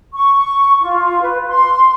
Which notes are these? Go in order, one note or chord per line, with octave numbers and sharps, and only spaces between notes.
C#6
F4
B4
C6